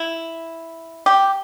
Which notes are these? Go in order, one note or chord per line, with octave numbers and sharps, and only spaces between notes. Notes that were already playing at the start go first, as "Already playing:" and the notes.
Already playing: E4
G4